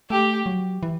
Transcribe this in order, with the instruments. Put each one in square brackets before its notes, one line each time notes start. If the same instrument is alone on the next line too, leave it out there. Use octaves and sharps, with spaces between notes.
[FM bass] A3 [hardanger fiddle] G4
[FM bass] F#3
E3